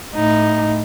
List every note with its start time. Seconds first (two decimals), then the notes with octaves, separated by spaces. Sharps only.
0.15 A2 D#4